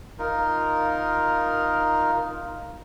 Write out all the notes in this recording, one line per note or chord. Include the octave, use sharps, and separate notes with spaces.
D#4 F4 A#4